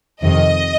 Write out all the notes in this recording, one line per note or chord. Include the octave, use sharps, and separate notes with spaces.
F2 C3 D#3 D#5